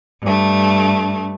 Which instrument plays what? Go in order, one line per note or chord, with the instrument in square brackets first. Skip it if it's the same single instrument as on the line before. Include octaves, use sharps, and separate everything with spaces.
[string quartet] G2 A3